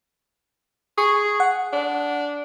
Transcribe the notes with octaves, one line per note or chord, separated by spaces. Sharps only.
G#4 C#6
F#5
D4